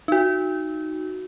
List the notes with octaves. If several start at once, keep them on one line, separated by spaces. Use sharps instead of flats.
D#4 F#4